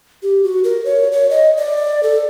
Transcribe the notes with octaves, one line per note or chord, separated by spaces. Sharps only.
G4
F#4
A#4
C#5
C#5
D#5
D5
A4